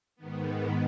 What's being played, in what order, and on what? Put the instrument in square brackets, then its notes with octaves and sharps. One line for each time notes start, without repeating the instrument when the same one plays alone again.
[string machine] G#2 D#3 B3